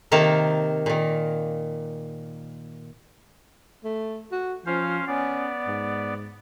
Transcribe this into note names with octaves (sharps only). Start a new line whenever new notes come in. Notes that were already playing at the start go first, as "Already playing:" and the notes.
C3 D#3 A#3 F5 A5
A#2 D#3
A3
F#4
F3 C#4 C5 F5
B3 C#4 D5
G#2